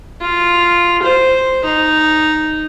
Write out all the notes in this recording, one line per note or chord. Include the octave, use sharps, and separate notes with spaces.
F4
C5
D#4